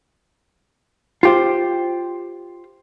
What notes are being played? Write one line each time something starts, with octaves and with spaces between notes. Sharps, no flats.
F4 G4 C5